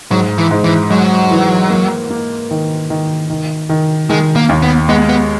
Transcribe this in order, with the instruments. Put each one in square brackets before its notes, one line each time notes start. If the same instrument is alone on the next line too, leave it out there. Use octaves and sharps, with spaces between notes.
[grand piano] G#2 [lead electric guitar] F#3
[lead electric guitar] E3
[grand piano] G#2
[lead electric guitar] E3
[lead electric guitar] F#3 [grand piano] G#3
[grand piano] E3
A#3
A#3
D#3
D#3
D#3
D#3
[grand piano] D#3 [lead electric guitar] G#3
[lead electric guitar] A#3
[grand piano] D#2
[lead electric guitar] B3
[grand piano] G#3 [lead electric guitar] B3
[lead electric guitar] B3